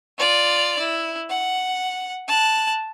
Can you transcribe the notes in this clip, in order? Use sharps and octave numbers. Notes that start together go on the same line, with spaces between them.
F4 D5
E4
F#5
A5 F#6